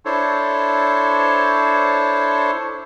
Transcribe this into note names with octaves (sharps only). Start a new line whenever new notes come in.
D4 E4 A4 C5 C#5